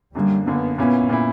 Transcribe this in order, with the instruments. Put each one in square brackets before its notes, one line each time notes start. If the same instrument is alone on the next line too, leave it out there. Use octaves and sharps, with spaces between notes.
[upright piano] F#2 D3 A#3 [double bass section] G3
[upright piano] F#2 D3 A#3 [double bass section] B3
[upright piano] A#2 A#3 C#4 E4 [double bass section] B3
[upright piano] A#2 A#3 C#4 E4